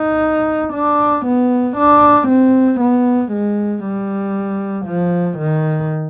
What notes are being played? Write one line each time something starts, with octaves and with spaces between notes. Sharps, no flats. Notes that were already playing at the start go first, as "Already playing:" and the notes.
Already playing: D#4
D4
B3
D4
C4
B3
G#3
G3
F3
D#3